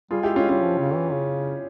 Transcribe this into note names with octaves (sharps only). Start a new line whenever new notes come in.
G3 F4 G#4
G#3 E4 G4
G#3 C#4 F4
G3 C#4 F4
F3
C#3
E3
C#3